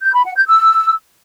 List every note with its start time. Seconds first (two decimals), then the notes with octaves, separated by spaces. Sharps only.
0.03 G6
0.14 B5
0.25 F#5
0.36 G6
0.47 E6